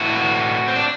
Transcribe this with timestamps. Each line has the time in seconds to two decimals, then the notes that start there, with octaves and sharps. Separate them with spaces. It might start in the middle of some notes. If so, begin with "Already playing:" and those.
Already playing: A2 E3 F#4
0.68 C4
0.76 D4